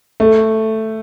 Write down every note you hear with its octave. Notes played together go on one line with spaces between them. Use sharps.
A3